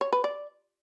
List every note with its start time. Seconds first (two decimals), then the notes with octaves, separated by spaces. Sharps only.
0.01 C#5
0.12 B4
0.24 D5